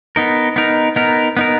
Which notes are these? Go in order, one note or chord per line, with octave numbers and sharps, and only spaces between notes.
B3 D#4 A#4
B3 D#4 A#4
B3 D#4 A#4
B3 D#4 A#4